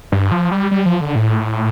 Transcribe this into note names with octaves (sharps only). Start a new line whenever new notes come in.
G2
F3
G3
G3
F3
D3
A2